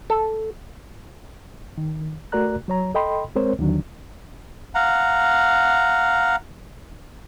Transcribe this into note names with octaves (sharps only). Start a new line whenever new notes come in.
A4
D#3
A3 F#4 A#4 D5 A#5 F#6
F#3 C#5 A#5
A4 D#5 G5 B5 C6
G#3 C4 A#4 C5 C#5
D#2 D3 D#3 F#3 D4
F5 F#5 A#5